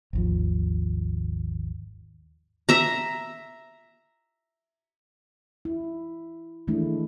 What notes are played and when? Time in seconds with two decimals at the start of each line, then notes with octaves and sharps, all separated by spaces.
0.13 G#1 D#2 F3
2.69 E5 A#5
5.65 E4
6.68 D#3 E3 G#3 A3 D4 E4